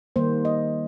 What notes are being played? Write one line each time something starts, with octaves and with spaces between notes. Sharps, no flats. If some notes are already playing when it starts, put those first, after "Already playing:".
D#3 G3 A#3 C5
D#5